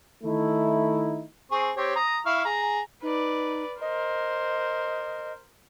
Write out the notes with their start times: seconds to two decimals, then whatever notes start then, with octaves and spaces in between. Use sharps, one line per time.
0.23 D#3 A3 D#4 E4
1.52 C4 G#4 C#6
1.77 C4 G4 C#5
1.96 A#5 D#6
2.26 E4 F5 C#6
2.45 G#4 A#5
3.02 D#4 B4 D5
3.81 A#4 C5 D#5